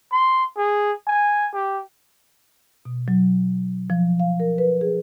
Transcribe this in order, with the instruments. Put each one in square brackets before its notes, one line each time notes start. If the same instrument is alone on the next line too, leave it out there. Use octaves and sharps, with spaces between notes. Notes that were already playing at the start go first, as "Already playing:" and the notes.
[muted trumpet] C6
G#4
G#5
G4
[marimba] B2
F#3
F3
F5
A#4
B4
G#4